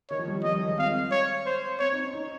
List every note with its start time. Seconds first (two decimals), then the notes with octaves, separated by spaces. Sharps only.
0.10 D#3 C#5
0.19 F3
0.27 G3
0.36 F3
0.43 G3 D#5
0.53 D#3
0.62 F3
0.69 G#3
0.78 C4 F5
1.12 C#5
1.46 C5
1.79 C4 C#5
1.91 D#4
2.02 C#4
2.13 D#4